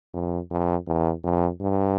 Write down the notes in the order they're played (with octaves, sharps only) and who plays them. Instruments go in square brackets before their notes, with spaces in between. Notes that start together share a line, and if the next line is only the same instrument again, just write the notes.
[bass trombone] F2
F2
E2
F2
G2